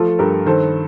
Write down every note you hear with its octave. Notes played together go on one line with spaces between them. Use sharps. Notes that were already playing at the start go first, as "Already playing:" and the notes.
Already playing: F3 A3 F4 A4
G2 G4 A#4
D#3 A4 C5